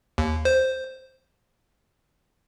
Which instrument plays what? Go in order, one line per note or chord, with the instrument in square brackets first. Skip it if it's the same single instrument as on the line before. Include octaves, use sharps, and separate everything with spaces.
[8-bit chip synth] D#2
C5